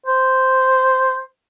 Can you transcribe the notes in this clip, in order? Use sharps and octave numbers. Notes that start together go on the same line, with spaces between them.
C5